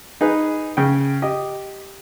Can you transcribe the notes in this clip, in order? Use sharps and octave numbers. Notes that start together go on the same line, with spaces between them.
D#4 G#4 B4
C#3 G5
G4 D#5